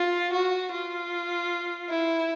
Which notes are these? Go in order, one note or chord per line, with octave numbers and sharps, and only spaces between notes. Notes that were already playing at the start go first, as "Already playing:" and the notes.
Already playing: F4
F#4
F4
E4